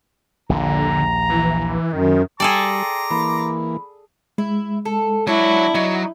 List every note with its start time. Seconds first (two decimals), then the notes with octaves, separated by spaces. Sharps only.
0.49 A#1 D#2 D3 A#5
1.30 E3
1.93 F#2 D#3
2.40 G3 G#4 A4 D5 G5 A#5 C6 D6
3.11 E3 A#3 B5
4.38 G#3 E4
4.85 A4
5.27 F#3 B3 D4 E4 C#5
5.75 F#3 D#4